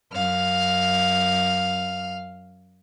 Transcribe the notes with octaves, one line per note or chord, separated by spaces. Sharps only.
F#2 F5 F6